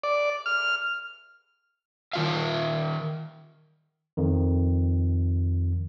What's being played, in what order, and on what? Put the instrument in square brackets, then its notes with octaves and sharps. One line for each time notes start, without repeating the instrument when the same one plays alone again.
[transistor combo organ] D5
F6
[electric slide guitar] D#3 B3 F4 E5 F5
[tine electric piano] F2 D#3